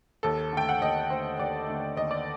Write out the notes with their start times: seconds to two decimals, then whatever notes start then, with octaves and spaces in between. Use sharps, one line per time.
0.23 D#2 A4
0.53 D3 A3 G5
0.69 F#5
0.81 D#2 D#5
1.10 D3 A3 C5
1.39 D#2 D5
1.67 D3 A3
1.96 D#2 D#5
2.11 D5